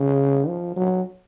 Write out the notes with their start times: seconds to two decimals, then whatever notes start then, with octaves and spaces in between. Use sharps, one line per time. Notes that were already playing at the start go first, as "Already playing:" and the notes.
Already playing: C#3
0.48 F3
0.76 F#3